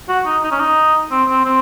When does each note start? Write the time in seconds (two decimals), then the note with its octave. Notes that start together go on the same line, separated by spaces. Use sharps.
0.09 F#4
0.26 D#4
0.43 D#4
0.51 C#4
0.59 D#4
1.11 C4
1.28 C4
1.45 C4